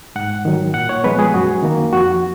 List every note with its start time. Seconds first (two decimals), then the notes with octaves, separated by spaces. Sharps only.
0.16 G#2 F#5
0.45 D#3 F#3
0.74 A#2 F#5
0.89 C#5
1.04 F3 G#3 B3 B4
1.19 G#4
1.34 F#2 F#4
1.63 D#3 A#3
1.93 F2 F#4